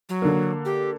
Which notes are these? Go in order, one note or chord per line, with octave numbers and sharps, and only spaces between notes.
F#3
D3 A#3
G4